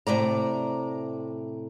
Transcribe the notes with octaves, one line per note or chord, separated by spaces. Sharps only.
A2 C3 D5 A#5